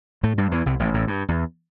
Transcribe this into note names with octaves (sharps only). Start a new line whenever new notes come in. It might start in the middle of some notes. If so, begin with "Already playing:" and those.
A2 A3
G2 G3
E2 E3
C2 C3
A1 A2
A1 A2
G2
E2